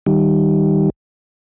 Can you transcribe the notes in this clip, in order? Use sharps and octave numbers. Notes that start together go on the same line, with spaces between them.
D#3 G3